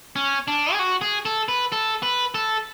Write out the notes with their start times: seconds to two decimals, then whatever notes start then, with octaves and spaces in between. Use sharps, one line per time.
0.16 C#4
0.48 D4
0.73 G#4
0.79 F#4
1.01 G#4
1.25 A4
1.48 B4
1.72 A4
2.03 B4
2.35 A4